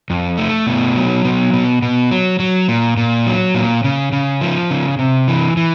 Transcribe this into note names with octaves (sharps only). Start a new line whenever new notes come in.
F2
A3
B2
F#3
B2
B2
B2
F#3
F#3
A#2
A#2
F#3
A#2
C#3
C#3
F3
C#3
C3
E3
E3